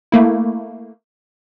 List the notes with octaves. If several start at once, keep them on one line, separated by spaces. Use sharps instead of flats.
A3 A#3 E4